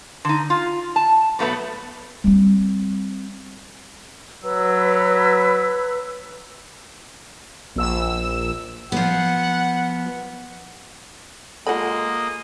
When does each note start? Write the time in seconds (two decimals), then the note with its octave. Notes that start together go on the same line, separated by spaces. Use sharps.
0.25 D3 D#4
0.50 F4
0.96 A5
1.39 B2 F#3 A3 B3
2.24 G3 C4
4.44 F#3 B4 E6
7.76 A#1 E6
8.92 F3 B3 F#5
11.67 G#3 A#3 F4 A4 D#5 F#5 B5